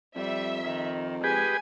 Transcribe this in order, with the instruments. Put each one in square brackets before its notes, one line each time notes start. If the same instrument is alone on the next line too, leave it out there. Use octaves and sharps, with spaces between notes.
[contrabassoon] F2 [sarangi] G3 [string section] E5
[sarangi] D#3
[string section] G#3 [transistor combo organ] G4 G#4 B4 [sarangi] G#5